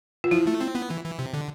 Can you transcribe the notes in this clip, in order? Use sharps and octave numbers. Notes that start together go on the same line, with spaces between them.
F4
F3 E4
A3
C4
B3
E3
E3
C3
D3